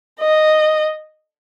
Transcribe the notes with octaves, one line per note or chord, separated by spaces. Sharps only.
D#5